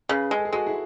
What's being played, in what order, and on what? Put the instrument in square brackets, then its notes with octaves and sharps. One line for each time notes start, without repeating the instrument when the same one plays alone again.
[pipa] C#3 [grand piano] G#4 B4
[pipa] G#3
[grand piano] A4
G#4
[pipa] G#3 [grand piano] F#4 A4
[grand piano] E4 G#4